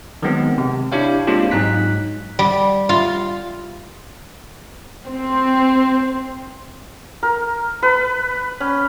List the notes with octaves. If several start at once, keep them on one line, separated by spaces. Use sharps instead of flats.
D#3 F#3 G#3 B3 C4
C3
D4 E4 G4 C#5 F5 G5
G#3 A#3 C4 D4 F4 G4
G#2 F#3 D#4 F#6 B6
G3
F4
C4
A#4
B4
C#4